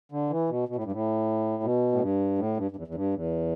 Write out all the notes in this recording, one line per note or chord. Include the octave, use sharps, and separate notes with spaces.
D3
E3
B2
B2
A2
G2
A2
B2
A2
G2
A2
G2
G2
E2
E2
G2
E2